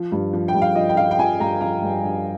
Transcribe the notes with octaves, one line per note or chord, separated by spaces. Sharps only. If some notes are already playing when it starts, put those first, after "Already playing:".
Already playing: F3
G2
F3
G5
G2
F5
F3 D#5
G5
F3 F5
G5
F3 G#5
G2 A#5
F3 A#5
G2
G2